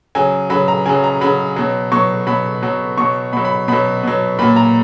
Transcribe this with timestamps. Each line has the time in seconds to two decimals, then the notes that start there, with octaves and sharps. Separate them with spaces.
0.15 C#3 F#3 G#5
0.50 C#3 F#3 B5
0.68 A#5
0.86 C#3 F#3 G#5
1.04 A#5
1.21 C#3 F#3 B5
1.56 B2 F#3
1.92 B2 F#3 C#6
2.27 B2 F#3 B5
2.62 B2 F#3
2.97 B2 F#3 C#6
3.33 B2 F#3 B5
3.45 B5
3.68 B2 F#3 B5
4.03 B2 F#3
4.39 A#2 F#3 B5
4.56 A#5